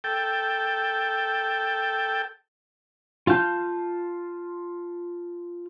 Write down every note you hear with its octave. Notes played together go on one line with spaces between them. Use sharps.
A4 G5
F4 F5 A5 G6